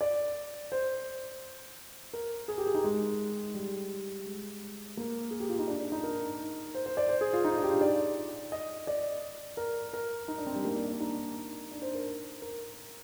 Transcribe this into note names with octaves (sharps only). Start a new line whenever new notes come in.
D5
C5
A#4
G#4
G4
G#4
D#4
G#3
G3
G#3
A#3
G#4
G4
F4
D#4
D4
D4
D#4
A#4
C5
C5
D5
C5
G#4
F4
D#4
D4
G4
F4
D5
D#5
D5
A#4
A#4
D#4
D4
C4
G3
A#3
D4
D4
D#4
D4
C5
A#4
A#4